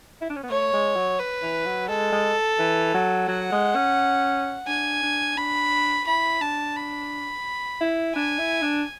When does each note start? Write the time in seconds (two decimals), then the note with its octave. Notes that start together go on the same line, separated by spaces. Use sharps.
0.21 E4
0.30 D4
0.36 C#4
0.43 B3
0.50 A3 C#5
0.73 G#3
0.96 F#3
1.19 B4
1.42 E3
1.65 F#3
1.89 G#3 A4
2.12 G#3
2.59 E3
2.94 F#3
3.28 F#3 F#5
3.52 G#3
3.75 C#4
4.67 D4 G#5
5.03 D4
5.37 D4 B5
6.07 E4 B5
6.41 D4 A5
6.76 B5
7.81 E4
8.16 D4 G#5
8.39 E4
8.62 D4